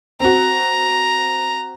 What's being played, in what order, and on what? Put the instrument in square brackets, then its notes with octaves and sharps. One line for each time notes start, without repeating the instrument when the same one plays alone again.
[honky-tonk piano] C4 F#4 [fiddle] A#5